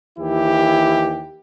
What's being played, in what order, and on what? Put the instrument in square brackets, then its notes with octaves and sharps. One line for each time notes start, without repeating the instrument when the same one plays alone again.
[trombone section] D#2 E3 E4 G4